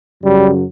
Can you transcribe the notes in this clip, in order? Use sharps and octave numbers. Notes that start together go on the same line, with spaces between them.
F#2 C#3 F#3 G3